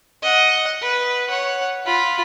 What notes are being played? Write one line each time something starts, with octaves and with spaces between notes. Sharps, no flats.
D#5 F#5
B4
C#5 F#5
F4 B5